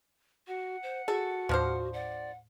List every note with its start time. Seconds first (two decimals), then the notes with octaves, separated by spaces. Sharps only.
0.47 F#4 F#5
0.83 C5
1.08 F#4 G#4 A4
1.49 D#2 A2 F3 D4 C5 F6
1.93 D5 F#5